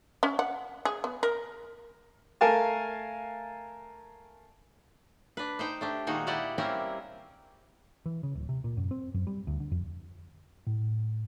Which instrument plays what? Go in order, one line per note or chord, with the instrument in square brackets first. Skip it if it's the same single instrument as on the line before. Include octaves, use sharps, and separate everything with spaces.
[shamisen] C#4
F#5
G#4
B3
A#4
[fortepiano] A3 A#4 F5 G#5 A5
[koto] D4 B4
D#4 C5 G5
A3 D4 G4
A#2 D#3 G#3 A#3 D#4 F#4
E4 G4 D5 D#5 F#5
G3 A#3 C4 C#4 E4 A#4
[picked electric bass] E3
C#3
D1
C3
A#2
F#2
C4
F#2
G3
D2
D3
F2
[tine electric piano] A2